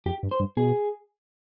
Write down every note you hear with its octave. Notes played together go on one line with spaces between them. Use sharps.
F2 G4
G2
C5
G2
B2 G#4